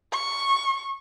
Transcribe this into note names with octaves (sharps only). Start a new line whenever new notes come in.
C#6